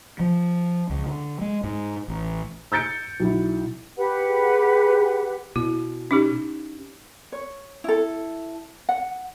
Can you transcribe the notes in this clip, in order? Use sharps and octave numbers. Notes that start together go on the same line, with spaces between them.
F3
C#2
D3
G#3
G#2
A1
E6 G6 A6 C#7 D7
B1 E4
G4 B4 F#5
G#4
B2 E4
C#4 D#4 G4
C#5
E4 A4
F#5